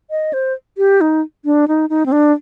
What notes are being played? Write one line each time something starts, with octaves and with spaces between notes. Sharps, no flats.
D#5
C5
G4
D#4
D4
D#4
D#4
C4
D4